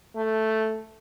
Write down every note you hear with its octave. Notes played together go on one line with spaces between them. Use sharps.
A3